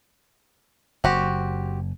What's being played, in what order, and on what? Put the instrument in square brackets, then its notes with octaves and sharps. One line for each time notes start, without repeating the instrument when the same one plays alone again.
[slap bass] F#1 [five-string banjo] C4 F#4 G4